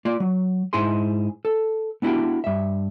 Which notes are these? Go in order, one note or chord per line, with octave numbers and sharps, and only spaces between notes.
A#3 F4 D5
F#3
G#2 E4 G#4 C6
A4
B3 D4 E4 F#4 G4
G2 E5